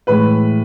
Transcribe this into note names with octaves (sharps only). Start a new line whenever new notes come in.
A2 E3 G#3 B4 B5